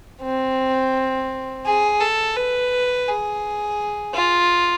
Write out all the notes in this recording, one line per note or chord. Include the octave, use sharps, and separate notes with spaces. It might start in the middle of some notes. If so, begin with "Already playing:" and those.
C4
G#4
A4
B4
G#4
F4